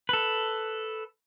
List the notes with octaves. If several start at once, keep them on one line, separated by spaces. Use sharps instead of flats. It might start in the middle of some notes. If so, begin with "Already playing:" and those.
A4 B4